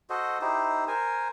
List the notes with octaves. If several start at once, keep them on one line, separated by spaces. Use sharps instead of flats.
F#4 A4 C5 D#5
D#4 E4 G4 C5
A#4 C5 G#5